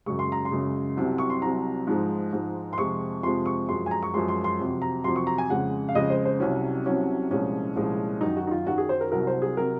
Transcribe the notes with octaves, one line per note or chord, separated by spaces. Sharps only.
F#2 C#3 G#3 C#6
C6
A#5
C6
F#2 C#3 G#3
C2 C3 F#3
C#6
C6
C2 C3 F#3 A#5
G#2 F3 G#3
G#2 F3 G#3
C6
F2 C3 F3 G#3 C#6
F2 C3 F3 G#3 C6
C#6
F#2 F3 G#3 C6
G#5
A#5
C#6
F#2 F3 G#3 C6
C6
C6
F2 C3 F#3
A#5
F2 C3 F#3 C6
C#6
A#5
G#5
F2 C#3 G#3 F#5
F5
F2 C#3 G#3 D#5
C5
C5
C2 C3 F#3 C#4
C2 C3 F#3 C#4
C2 A#2 F3 G#3 C#4
C2 A#2 F3 G#3
F#2 D#3 F#3 D#4
F#4
D#4
F4
F#2 D#3 F#3 F#4
G#4
C5
A#4
C2 C3 F#3 A#4
C5
G#4
C3 F#3 A#4